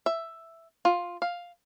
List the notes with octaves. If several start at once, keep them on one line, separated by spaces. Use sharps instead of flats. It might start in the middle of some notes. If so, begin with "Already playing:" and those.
E5
F4
F5